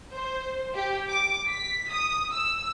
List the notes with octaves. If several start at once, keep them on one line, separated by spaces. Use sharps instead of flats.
C5
G4
D6
B6
D#6
E6